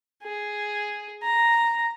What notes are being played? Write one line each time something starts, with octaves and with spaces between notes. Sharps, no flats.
G#4
A#5